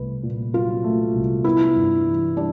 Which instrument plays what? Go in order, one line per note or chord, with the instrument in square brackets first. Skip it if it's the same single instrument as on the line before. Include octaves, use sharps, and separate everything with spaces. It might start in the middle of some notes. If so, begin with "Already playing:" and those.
Already playing: [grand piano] C2 A3 [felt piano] B4
[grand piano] A#2
[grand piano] F#3 [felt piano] F4
[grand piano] A3
C2
[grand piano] B3 [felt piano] E4
[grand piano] G2
E3
[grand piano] G3 [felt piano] D4